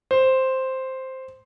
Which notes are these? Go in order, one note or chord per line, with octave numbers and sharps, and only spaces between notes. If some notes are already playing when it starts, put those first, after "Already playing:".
C5